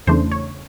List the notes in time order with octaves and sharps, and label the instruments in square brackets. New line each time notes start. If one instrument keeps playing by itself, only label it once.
[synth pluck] E2 C#3 E3 A3 D4 C5
C#5